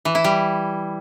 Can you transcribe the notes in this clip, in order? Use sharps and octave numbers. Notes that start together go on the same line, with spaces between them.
E3
E4
G3